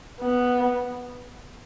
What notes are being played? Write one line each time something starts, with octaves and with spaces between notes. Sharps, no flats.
B3